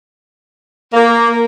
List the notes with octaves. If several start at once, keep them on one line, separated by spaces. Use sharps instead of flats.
A#3